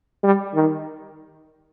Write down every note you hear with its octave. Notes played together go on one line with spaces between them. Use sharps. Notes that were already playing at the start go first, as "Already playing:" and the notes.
G3
D#3